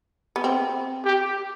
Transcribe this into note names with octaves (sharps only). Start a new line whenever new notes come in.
B3
C4
G4